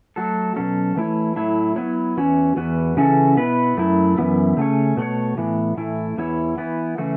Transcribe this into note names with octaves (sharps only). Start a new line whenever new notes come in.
F#3 A3 F#4 A4
B2 F#3 C#4 A4
E3 A3 E4 C#5
A2 F#3 A3 E4 C#5
F#3 B3 E4 C#5
E2 E3 C#4 F#4 C#5
E2 E3 B3 F#4 B4
C#3 E3 C#4 F#4 A4
B2 B3 E4 B4
F#2 F#3 A3 E4
F#2 C#3 E3 B3 E4
C#3 A3 C#4 A4 C#5
B2 A3 F#4 C#5
A2 E3 B3
A2 E3 A3 E4
E2 E3 B3 E4 C#5
E3 B3 E4
C#3 E3 A3 F#4